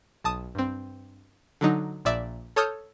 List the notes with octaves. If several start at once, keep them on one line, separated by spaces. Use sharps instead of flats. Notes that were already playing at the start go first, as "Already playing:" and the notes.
B1 A5 D#6
G2 C4
D3 F#3 D#4
A#1 A#2 D5 E5 E7
A4 C#5 A5 D#6 F6 G6